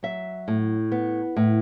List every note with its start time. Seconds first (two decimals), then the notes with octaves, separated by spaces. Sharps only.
0.03 F#3 E5
0.48 A2
0.92 B3
1.37 A2